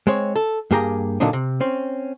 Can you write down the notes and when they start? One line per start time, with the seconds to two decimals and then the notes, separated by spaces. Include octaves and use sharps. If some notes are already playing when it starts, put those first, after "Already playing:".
0.07 G#3 C4 C#5
0.36 A4
0.71 G2 A#3 G4 G#4 G5 A#5
1.20 A#2 D3 F#3 A#3 D4 D#4
1.33 C3
1.60 C4 C#4